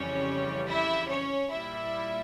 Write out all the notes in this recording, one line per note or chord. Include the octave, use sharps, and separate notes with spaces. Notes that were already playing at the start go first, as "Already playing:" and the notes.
Already playing: F2 C#3 E3 G3 C#4 C#5
E4 E5
C#4 C#5
A#2 G3 E4 E5